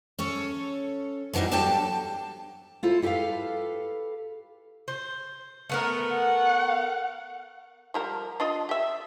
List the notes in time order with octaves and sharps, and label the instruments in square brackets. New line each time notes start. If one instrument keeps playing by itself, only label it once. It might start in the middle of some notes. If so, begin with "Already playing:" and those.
[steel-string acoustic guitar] C#4 A4 C#5
D3 E3 F#3 G3 D#4
F#3 D4 G4 A4 G5 A5
E4 F4 A4 C5
E4 G4 A4 B4 F5
[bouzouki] C5
A3 B3 A#4
[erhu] F#5
[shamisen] F3 G3 A#4
D4 F4 D#5
G4 E5